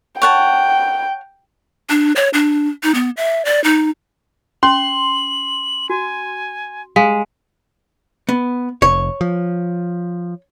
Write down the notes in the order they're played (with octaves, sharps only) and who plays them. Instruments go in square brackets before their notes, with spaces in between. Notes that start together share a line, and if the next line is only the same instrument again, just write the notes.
[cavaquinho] C#5 F#5 A5 [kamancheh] G5
[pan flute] D4
C#5
D4
D#4
B3
E5
D5
D#4
[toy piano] C#4 [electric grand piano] C6 [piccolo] F#7
[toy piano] F#4 [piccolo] G#5
[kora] G#3 [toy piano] F5
[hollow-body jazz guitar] B3
[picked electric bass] F1 [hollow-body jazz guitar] C#5
[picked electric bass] F3